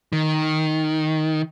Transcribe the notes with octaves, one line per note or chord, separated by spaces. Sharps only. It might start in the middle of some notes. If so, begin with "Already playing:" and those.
D#3